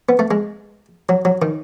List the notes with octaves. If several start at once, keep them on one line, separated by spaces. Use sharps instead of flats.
B3
A3
G#3
F#3
F#3
D#3